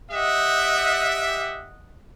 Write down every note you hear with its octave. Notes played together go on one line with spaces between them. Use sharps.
G4 D#5 E5 F#5